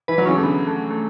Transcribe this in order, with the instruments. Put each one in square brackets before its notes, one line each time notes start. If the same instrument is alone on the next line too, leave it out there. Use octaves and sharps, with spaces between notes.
[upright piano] E3 [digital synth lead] B4
[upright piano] F#3
[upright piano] C#3 E3 [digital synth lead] C#4
[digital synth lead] A3
[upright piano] D3 [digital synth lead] B3
[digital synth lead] A3
A3